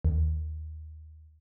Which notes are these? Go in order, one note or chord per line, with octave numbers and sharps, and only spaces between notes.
D#2